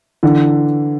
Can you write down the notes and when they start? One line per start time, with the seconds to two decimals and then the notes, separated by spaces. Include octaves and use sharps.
0.23 D3 E3